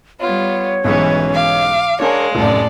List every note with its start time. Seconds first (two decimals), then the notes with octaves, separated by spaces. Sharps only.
0.21 G3 B3 F4 C#5
0.85 B1 G#2 E3 C#4 B4
1.36 F5 D6
2.00 G#3 D4 A#4 C#5 F5 G#5 A5
2.35 F1 F#2 A2 A4 D5